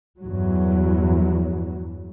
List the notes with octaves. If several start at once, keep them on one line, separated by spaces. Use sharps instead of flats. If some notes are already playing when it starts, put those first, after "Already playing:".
E2 G2 F#3